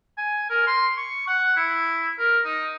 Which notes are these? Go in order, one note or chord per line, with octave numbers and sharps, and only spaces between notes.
G#5
A#4
C6
C#6
F#5
E4
A#4
D#4